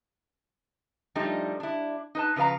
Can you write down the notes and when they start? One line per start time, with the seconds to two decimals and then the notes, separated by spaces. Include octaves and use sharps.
1.15 F3 G3 A3 D4 D#4
1.60 D4 E4
2.15 D#4 B4 A5
2.36 C#3 F3 B4 F5 A#5